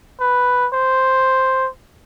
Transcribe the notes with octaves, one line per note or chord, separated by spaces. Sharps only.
B4
C5